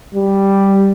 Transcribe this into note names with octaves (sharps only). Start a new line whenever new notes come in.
G3